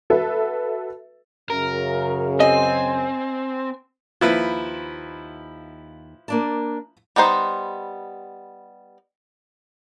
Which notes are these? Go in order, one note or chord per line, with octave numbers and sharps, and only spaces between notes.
F#4 A4 B4 E5
F#2 C#3 A#4
C4 D#5 G#5
D#2 F3 E4 B4 C5
A#3 D4 A5
G3 B3 D#4 C5